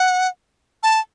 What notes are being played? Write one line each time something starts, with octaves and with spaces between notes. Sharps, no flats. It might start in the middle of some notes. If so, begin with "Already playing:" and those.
Already playing: F#5
A5